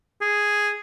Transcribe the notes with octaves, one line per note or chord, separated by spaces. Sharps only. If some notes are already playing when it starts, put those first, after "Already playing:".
G#4